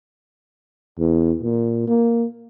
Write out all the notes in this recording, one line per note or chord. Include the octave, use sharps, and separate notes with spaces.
E2
A#2
A#3